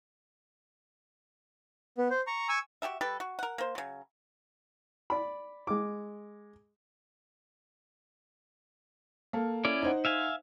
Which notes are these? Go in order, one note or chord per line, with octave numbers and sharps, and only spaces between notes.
B3
C5
A#5 C#6
G#5 C#6 E6
F#4 G4 A4 E5
G3 G4 A4 B4
F#4
A#4 F#5
A#3 C5
C#3 F#3
D5 B5
G#3 D6
A#3 A4
C#4 E4 D5
D#4 C5 F#5
E5 F5 G#5